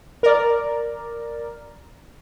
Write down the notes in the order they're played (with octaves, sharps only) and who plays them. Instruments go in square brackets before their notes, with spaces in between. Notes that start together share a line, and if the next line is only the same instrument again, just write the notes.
[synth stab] A#4 D5